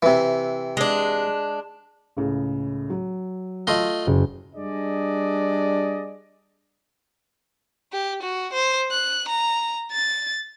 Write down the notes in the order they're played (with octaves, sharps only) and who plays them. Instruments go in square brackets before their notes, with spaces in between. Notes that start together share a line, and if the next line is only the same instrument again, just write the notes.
[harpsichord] C3 E3
[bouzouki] G#3 D4
[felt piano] C#2 A2 C#3
F#3
[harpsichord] A3 F4 D#5 [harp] C6
[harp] F#1
[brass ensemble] G3 D4 G#4 D5 D#5
[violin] G4
F#4
C5
F#6
A#5
A6